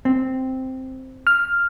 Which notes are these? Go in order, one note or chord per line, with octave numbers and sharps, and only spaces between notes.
C4
F6